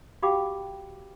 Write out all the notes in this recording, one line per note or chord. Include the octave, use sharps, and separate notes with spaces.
F#4 G4 F5 G5 B5 D6